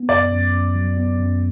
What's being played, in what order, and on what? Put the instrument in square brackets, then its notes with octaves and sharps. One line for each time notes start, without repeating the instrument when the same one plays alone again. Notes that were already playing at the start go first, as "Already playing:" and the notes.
Already playing: [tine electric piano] B3
[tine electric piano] F#2 [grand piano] D5
[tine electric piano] F#2
F#2
F#3
B3
F#2